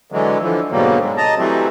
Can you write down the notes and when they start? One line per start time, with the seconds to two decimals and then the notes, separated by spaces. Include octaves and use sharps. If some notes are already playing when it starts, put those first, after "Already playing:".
0.12 D3 E3 F#3 G#3
0.42 D3 E3 F3
0.72 G#2 B2 D3 F#3 G3 A#3
1.03 G#3
1.17 D#5 A5 A#5
1.38 E3 F#3 G3 A3 C4